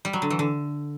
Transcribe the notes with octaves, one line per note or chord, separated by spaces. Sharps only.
G3
F#3
D3
E3
D3